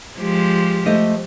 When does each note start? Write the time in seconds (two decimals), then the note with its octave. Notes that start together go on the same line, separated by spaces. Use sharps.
0.19 F3 G#3 G4
0.86 A3 C5 D#5